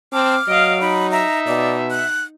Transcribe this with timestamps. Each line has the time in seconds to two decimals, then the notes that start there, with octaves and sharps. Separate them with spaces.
0.13 C4 A5 D6 F6
0.48 F#3 D#5 F5 D7
0.81 D#4 B5
1.11 E5 A#5
1.47 B2 D5
1.90 F#6